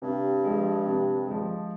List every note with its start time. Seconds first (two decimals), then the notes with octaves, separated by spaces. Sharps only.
0.02 G2 C3
0.44 F3 G#3
0.86 C3
1.27 F3 G#3